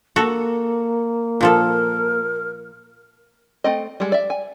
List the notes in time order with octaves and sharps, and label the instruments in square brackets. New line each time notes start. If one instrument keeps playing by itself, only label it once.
[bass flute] A#3 [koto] F#4 A4 A#5
[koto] A#2 F3 A4 [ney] A#4
[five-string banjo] A3 C4 D#5
G3 G#3
D5 E5
G#5